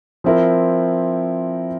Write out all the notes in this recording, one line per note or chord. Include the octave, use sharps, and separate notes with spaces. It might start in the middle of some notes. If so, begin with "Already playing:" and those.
F3 C4 E4 A#4